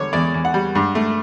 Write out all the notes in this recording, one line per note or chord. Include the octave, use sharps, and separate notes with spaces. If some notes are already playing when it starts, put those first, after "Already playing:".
Already playing: E2 D3 G3 C#5
E2 D5
E2
F#5
G3
G2
A3